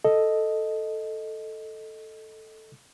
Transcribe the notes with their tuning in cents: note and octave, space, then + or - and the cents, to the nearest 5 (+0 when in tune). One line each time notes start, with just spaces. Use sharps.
A4 +0 D#5 +0